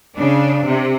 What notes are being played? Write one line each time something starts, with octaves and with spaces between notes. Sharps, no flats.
C#3 D4
C3